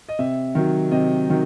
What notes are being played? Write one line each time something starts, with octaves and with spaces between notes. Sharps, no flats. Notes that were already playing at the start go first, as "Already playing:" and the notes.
D#5
C3 E5
D#3 F#3
C3 D#5
D#3 F#3